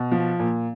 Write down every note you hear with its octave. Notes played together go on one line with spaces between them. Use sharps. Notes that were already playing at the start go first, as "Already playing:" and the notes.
Already playing: B2
F3
A#2